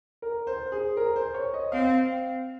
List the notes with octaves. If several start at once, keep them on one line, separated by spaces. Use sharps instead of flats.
A#4
C5
G#4
A#4
C5
C#5
D#5
C4 F5